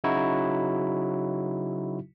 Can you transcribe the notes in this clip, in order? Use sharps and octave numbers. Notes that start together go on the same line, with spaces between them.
C#3 F#3 D#4 E4 F#4